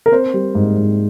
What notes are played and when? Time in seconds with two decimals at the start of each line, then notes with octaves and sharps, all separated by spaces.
0.06 A#4
0.12 C4 C5
0.34 G3
0.55 G#2
0.77 G#2